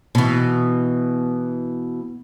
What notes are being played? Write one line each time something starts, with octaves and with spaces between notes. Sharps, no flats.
B2 E3